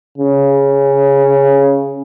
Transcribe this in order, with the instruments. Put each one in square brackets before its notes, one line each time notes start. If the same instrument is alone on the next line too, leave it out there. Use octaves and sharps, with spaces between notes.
[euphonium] C#3